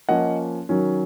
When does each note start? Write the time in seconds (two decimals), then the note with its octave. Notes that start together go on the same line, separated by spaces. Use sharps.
0.09 F3 A#3 C#4 D#5 F#5
0.69 D#3 F#3 C#4